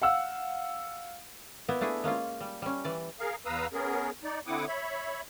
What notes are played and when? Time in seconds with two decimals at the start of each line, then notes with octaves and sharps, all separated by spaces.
0.02 F5 F#5 E6
1.68 A#3 B3 E4
1.81 A3 D4 E4 G#4
2.04 G#3 A#3 C#4 F4
2.41 G3
2.62 G3 C#4
2.84 E3 D5
3.20 G#4 A#4 F5
3.46 E2 B4 F5 A#5 D#6 E6
3.73 B3 C#4 G#4 A#4
4.24 D#4 D5
4.47 D3 C4 E4 F#5 D6 D#6
4.68 C#5 E5 B5